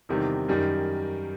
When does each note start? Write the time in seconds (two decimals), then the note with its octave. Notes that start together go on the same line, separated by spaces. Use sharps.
0.09 E2 C3 D#3 G3
0.48 F#2 D#3 G3